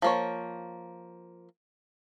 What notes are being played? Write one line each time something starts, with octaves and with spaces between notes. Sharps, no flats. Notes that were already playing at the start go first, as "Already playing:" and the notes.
F3 A#3 C#5